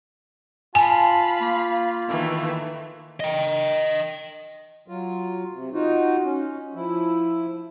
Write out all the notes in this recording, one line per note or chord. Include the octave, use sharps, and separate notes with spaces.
F4 F5 G#5 A5 B5
A#3
D#3 E3 A3
D#5 G5
F#3 F4
C3
D#4 F4 F#4
C#4
F3 E4